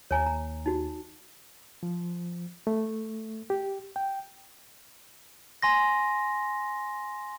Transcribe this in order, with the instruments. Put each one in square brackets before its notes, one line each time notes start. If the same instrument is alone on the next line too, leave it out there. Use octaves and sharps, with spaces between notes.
[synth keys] D#2 [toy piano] C#5 G#5 A#5
[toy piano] A#5
D#4 F#4
[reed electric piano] F3
A3
G4
G5
[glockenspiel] G#5 C6 A#6